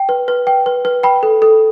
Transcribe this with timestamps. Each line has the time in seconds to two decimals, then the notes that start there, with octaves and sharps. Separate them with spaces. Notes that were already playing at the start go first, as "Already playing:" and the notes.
Already playing: G5
0.09 B4
0.28 B4
0.47 G5
0.66 B4
0.85 B4
1.03 G5 B5
1.23 A4
1.42 A4